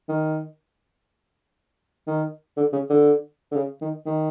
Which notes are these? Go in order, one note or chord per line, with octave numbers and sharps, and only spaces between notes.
D#3
D#3
D3
C#3
D3
D3
C#3
D#3
D#3